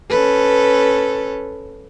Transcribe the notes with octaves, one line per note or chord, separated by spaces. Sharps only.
C#4 A4 B4